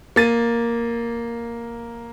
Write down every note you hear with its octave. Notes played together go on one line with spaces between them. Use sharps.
A#3 A6 D#7